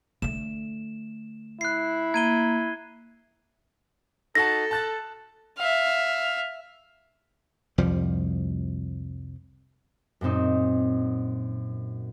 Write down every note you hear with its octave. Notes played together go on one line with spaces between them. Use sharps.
D3 A3 E7
E4 F#6 C7
A#3 G#6 D#7 G7
D#4 F#4 A4 A5 A#6
A5 F#6 A6
E5 F5
C2 F2 F3 G3
F#2 A#2 C4 D#4